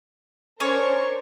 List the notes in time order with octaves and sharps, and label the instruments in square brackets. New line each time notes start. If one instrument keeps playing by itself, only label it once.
[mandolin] C#4 D4 C#5 [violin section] A#4 C5 C#6